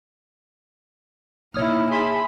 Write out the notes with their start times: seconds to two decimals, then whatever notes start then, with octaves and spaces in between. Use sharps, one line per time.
1.54 B2 A#3 D#4 E4 C#5 D#6 F6
1.92 G#4 E5 A5 B5 C6